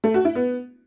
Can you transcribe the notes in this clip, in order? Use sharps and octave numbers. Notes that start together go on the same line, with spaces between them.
A3
F#4
E4
B3